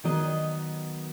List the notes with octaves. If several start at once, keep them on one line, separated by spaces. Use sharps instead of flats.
D#3 F#3 B3 D#5